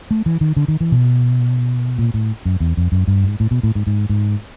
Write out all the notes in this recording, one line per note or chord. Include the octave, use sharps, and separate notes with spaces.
A3
E3
D#3
D3
D#3
E3
B2
A#2
A2
F#2
E2
F2
F#2
G2
G#2
A2
B2
A2
G#2
G#2
G#2